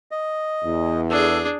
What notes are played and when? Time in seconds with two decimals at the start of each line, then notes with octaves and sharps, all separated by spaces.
0.11 D#5
0.63 E2
1.10 D4 G#4 A4